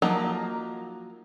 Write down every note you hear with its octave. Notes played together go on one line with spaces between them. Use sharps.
F3 F#3 A#3 D#4